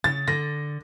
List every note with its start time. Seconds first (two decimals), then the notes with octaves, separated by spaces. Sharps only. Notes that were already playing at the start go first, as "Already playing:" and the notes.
0.04 C#3 A6
0.28 D3 A#6